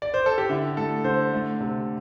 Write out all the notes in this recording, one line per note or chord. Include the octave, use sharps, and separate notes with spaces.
D5
C5
A4
G4
D3 E4
A3 A4
D3 C5
A3
C3